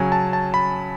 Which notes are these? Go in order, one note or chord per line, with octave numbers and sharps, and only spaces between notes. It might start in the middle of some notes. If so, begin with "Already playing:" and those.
Already playing: C#3 F#3 C#4 G#5
A5
A5
B5